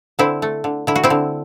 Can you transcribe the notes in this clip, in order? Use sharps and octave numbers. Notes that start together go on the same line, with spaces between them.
D3 C4 E4
A3
D3
D3 E4
F#4
C4 E4
D3